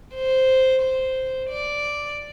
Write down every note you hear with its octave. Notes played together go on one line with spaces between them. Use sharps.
C5
C5
D5